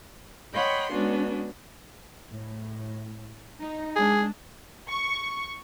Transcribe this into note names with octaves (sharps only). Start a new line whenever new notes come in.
C#5 D#5 F#5 G5 B5 C6
G#3 B3 C#4 D4 F#4
A2
D#4
G#3 D4 G#4
C#6